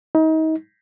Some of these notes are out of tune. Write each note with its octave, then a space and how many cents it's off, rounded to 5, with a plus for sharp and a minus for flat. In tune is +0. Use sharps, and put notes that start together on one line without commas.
D#4 +30